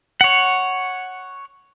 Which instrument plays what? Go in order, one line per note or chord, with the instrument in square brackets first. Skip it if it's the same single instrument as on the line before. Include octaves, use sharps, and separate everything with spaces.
[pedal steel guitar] C#5 F#5